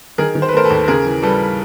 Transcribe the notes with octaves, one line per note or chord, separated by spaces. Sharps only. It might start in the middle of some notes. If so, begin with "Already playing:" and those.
D#3 G#4 A#4
D#3
C5
B4
A3 A#4 C5
A4 B4
D#2
C#3 G#4 A#4
E3
G3 A4 B4